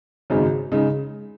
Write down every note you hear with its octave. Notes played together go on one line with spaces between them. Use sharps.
G#1 F#2 C#3 G#3 D#4
C#3 G#3 D#4